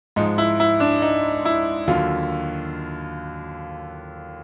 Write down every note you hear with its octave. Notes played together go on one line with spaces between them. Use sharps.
G#2 F3 G#3 D#4
E4
E4
D4
D#4
E4
D#2 D3 F#3 F4